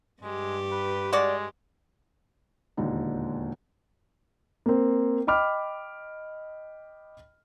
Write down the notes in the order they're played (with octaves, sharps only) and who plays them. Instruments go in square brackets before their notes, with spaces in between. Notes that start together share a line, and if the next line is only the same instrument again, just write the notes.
[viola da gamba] G2 G4 [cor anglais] G#3
[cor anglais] B4
[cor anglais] G#3 [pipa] F#4 D5
[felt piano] E1 D#2 A#2 D3 D#4
[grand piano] A#3 C4
D#5 G5 B5 D6 F6